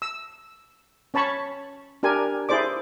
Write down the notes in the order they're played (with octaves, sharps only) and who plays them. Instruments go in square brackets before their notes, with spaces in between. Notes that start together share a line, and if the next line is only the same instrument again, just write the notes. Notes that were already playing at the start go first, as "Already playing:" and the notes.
[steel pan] E6
C#4 C#5 A5 B5 C#6
D4 G4 A#4 G#5
E4 G#4 C5 D5 D6